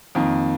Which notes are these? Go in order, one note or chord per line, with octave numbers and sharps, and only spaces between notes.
F2 D#3 A#3